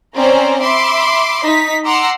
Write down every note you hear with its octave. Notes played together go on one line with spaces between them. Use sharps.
C4 C#4 C5 D5 A#5
E5 B5 C6 D6
D#4 B6
F#5 A#5 C6 D6 E6